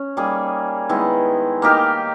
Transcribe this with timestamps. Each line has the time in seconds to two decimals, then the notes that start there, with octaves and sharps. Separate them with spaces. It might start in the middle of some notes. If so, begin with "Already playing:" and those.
Already playing: C#4
0.17 G3 A#3 D#4 G#4
0.89 D#3 G#3 B3 E4
1.62 A#3 D#4 G4 A#4